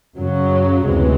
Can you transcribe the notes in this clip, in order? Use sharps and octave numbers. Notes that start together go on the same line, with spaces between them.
F#2 C#3 F#3
D2 C3 E3 G#3